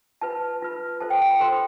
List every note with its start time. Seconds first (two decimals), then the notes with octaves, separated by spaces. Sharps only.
0.21 F4 B4 A5
0.62 F4 B4
1.00 F4 A4 C5 A5
1.10 G5
1.21 G5
1.31 B5
1.40 F4 A4 C5 C6